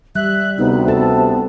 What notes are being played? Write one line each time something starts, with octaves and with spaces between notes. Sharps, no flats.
G3 E5 F#6
D2 C3 B3 D#4
A4 A5